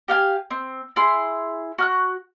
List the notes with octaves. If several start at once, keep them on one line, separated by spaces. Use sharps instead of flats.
G4 F5 G5 G#5
C4
E4 G#4 C6
F#4 F6 F#6